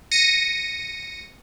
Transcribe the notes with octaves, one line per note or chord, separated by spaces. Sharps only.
A#6 C#7 D#7